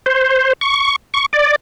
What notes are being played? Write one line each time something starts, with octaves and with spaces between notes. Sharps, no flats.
C5
C#6
C#6
D5